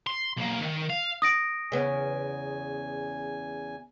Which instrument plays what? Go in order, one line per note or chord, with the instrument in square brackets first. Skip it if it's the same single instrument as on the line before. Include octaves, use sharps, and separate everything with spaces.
[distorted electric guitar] C6
B1 A#3
D#3
F5
[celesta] D#6 A#6 D7
[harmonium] E2 G#5 [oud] C#3 B3 C#4